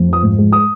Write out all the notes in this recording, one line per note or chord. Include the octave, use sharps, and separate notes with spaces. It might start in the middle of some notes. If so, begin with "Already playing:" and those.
Already playing: F2
F3 D#6
G#2
G#3
D#6